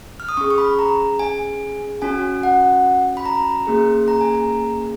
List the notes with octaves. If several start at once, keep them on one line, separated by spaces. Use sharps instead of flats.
F6
D#6
C#4 G#4 C#6
C#6
B5
A#5
G#5
C#4 F#4 G#5
F#5
B5
A#5
A#3 C#4 G#4
A#5
G#5
A#5